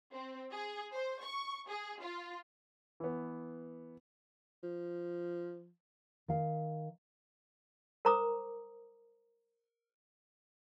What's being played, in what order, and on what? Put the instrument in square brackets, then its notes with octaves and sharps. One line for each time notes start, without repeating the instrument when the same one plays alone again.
[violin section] C4
G#4
C5
C#6
G#4
F4
[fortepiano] E3 B3
[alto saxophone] F3
[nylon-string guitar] D#3 F5
[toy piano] A#4 C5 A#5 D6 D#6